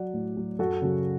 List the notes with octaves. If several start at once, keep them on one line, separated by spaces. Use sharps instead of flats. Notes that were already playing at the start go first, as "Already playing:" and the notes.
Already playing: F#3 D5 F#5
A2
F#3
F#2 F#4 A4
C#3 F#3